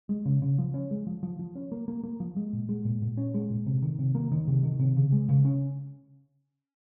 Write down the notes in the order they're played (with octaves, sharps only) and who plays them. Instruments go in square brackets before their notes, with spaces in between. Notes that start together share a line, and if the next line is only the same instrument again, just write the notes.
[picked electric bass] G#3
C#3
C#3
F3
C#4
G#3
F3
F3
F3
C#4
A#3
A#3
A#3
F3
G#3
A#2
G#3
A#2
A#2
C#4
G#3
A#2
C3
D#3
C3
A#3
D#3
C3
D#3
C3
C#3
G#3
C#3
C#4